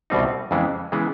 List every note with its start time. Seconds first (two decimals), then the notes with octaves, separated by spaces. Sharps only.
0.10 C2 B2 G3 C4 D#4
0.51 F2 C#3 E3 G#3 B3
0.92 C#3 E3 G#3 B3